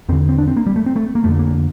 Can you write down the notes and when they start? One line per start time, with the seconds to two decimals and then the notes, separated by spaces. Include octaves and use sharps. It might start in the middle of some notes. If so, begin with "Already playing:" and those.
0.09 E2 C4
0.12 D3
0.29 C4
0.38 D4
0.47 C4
0.57 A#3
0.66 G3
0.76 A3
0.86 C4
0.96 A3
1.15 A#3
1.24 F2 D3 A3
1.39 A#3